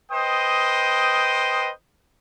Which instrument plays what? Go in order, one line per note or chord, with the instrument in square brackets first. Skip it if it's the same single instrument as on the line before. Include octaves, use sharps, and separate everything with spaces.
[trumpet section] B4 C5 D#5 G5 D#6